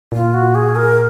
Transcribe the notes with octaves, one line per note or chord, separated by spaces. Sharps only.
A#2 F4
F#4
G#4
A#4